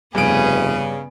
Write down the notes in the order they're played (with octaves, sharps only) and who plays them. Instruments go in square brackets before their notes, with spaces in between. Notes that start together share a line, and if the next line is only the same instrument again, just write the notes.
[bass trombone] F1 [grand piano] G2 D7 [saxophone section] C#3 [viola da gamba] B3 G#4 B4